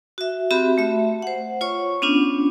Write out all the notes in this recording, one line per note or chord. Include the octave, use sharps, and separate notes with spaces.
F#4 E5
C4 F#4 G4 E5 B5
A3 E5
C5 F#5
F4 C#5 C#6
B3 C#4 D4 F4